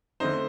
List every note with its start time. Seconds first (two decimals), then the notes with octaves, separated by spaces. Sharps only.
0.20 D3 A3 C4 D#4 C5